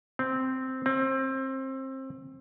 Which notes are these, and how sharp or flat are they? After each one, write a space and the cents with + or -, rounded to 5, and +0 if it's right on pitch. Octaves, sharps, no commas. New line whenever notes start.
C4 -5
C4 +25